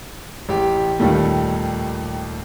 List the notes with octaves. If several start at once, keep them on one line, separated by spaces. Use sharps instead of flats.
A1 G4
D#2 A#2 D#3 G3 A3